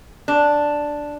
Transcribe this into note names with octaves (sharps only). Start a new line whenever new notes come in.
D4